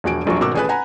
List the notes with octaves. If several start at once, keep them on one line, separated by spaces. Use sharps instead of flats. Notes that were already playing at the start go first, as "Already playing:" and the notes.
E1 A#1 F#4 G#5 D7
D#1 A#1 F#3 C#6
G#1 B2 F#4 A#4 D6 E6
A1 G#4 A4 B4 G#5 F#6
F#5 G#5 A#5 B5